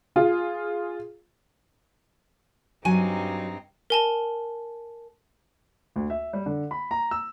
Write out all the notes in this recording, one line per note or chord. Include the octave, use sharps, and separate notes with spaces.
F4 G#4
G2 F#3 C4 D#4 G#5
A#4 G#5 A5
D2
E5
G3
D3
B5
A#5
E6